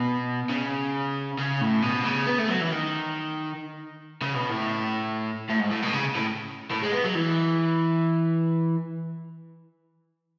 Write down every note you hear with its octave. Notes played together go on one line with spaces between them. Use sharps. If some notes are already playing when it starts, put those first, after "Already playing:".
Already playing: B2
C#3
C#3
A2
B2
C#3
B3
A3
F#3
E3
D#3
C#3
B2
A2
A2
G#2
A2
B2
C#3
A2
A2
G#3
B3
F#3
E3